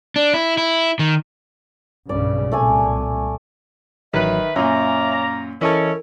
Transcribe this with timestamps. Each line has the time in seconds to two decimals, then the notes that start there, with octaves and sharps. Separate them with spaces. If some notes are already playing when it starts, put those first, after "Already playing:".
0.16 D4
0.34 E4
0.58 E4
0.99 D#3
2.09 B1 G2 C#3 D5
2.52 C2 A#2 A3 D5 G#5
4.14 A1 D#3 F#3 B4 E5
4.56 F#2 A#2 C#5 D5 F5 G#5 A#5
5.61 E3 C#4 E4 A4 A#4 D#5